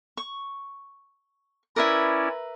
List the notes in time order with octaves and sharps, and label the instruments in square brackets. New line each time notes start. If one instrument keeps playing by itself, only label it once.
[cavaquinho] C#6
[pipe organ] C#4 E4 D5 [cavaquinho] A#4 B4 E5